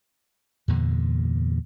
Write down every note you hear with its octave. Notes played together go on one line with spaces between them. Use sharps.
E2 G2 A#2 D3